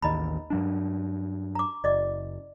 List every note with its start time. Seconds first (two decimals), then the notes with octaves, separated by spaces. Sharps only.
0.02 A1 D#2 D#3 D#5 A#5 B5
0.50 G2 F#3 D4
1.55 A#5 D6
1.84 F#1 D5 D#5 D6